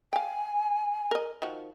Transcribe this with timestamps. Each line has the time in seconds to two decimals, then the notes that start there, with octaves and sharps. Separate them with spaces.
0.13 F5 G5 G#5
1.11 A#4 D#5
1.42 D#3 F3 F#4